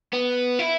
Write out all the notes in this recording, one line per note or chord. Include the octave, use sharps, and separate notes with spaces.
B3
E4